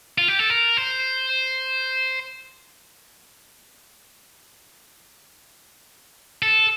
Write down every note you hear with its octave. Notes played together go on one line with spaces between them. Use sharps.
F4
G4
A4
A#4
C5
A4